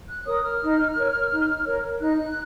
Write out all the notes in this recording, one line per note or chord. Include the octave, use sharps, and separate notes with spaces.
F#6
A#4 C#5 D#6
F6
D#4
A#4 C#5
D#4
A#4 C#5
D#4 F#6